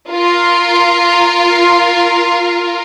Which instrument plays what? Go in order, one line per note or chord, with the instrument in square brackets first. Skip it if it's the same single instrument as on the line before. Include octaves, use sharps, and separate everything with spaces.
[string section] F4 A#4